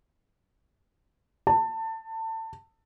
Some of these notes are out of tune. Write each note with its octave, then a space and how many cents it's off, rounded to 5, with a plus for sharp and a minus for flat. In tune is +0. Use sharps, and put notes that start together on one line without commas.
A5 +25